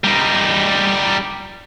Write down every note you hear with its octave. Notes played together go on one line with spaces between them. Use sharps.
G3 D#4